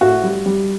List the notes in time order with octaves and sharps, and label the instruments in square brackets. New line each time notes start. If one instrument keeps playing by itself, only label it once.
[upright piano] A2 F#4
G3
G3